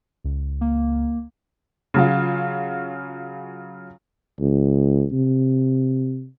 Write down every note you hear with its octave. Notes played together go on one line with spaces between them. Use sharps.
C#2
A#3
C#3 F#3 F4
C#2
C3